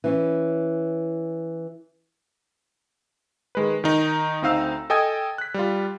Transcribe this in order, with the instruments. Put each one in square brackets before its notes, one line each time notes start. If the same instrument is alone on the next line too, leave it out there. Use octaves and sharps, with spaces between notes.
[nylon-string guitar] E3 C#4
[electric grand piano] D#3 G#3 B4
D#3 D#4
D2 C4 D#4 F5 E6
A4 D#5 G5 G#5 D#6 G#6
F#6 B6
G3 F4